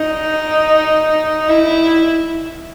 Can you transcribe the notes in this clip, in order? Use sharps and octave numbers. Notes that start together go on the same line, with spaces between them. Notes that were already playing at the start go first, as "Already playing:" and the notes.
Already playing: D#4
E4